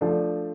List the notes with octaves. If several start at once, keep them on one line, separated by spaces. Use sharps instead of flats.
F3 A3 D4